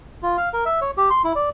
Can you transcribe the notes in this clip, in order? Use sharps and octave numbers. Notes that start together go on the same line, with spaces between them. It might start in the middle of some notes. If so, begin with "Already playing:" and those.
F4
F5
A#4
E5
C#5
G4
C6
E4
D5